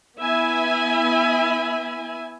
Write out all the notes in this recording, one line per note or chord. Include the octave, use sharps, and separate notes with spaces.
B3 E4 E5 G#5 B5